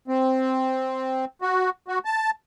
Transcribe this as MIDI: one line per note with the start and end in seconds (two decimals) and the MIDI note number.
0.08 1.25 60
1.42 1.70 66
1.88 1.99 66
2.05 2.30 81